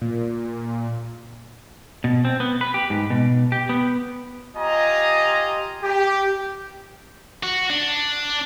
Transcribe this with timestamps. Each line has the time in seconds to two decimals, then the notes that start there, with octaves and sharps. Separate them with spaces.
0.02 A#2
2.04 B2
2.25 C4
2.40 B3
2.61 B4
2.74 G4
2.90 G#2
3.10 B2
3.52 G4
3.69 B3
4.56 F4 G4 D#5 G#5 A#5
5.84 G4
7.43 F#4
7.70 D4